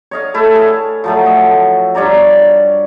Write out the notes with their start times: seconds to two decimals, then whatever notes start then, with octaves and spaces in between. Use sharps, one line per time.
0.11 C#5 D#5 F5
0.34 A3 E4 A4 E5
0.55 G#4 F5
1.04 F3 F#3 A3
1.26 D#5
1.95 G2 C#5 D5 A#5